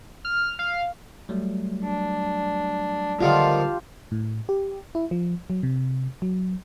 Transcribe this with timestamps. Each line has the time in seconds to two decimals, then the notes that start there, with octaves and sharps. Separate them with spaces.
0.25 F6
0.59 F5
1.29 F#3 G3 A3
1.84 D4
3.21 D3 D#3 F3 F4 G4 F5 A5
4.12 A2
4.49 G4
4.95 E4
5.11 F3
5.50 F#3
5.63 C3
6.22 F#3